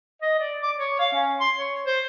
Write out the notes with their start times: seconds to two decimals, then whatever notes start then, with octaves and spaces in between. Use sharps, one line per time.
0.22 D#5
0.39 D5
0.62 D6
0.77 C#5
1.00 F5
1.13 C#4
1.40 C6
1.57 C#5
1.86 C5